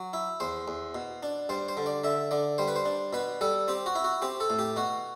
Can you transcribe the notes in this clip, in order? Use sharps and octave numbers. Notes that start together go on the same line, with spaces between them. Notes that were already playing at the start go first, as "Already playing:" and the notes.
Already playing: F#3
E4
E2 C5
E2
B2
D4
G2 C5
C5
D3
D5
D3 E5
D3 D5
G3 C5
B4
C5
D4
B2 B4
G3 A4
C4 G4
F#4
E4
F#4
C4 G4
A4
A2
G4
B2 F#4